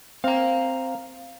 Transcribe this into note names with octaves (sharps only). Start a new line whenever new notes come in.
C4 F5 A#5